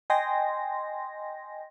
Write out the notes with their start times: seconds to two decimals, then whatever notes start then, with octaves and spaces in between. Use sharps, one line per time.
0.10 D#5 G5 G#5 C6 A#6